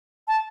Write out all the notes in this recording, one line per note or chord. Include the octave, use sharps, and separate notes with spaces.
A5